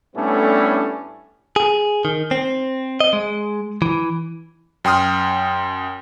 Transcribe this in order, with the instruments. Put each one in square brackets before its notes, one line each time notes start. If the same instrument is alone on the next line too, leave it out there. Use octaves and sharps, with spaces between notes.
[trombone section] A2 G3 A3 B3 C#4 D4
[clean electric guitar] G#4
D#3
C4
D#5
G#3
E3
[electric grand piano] F#2 G5 C6 D#6 F6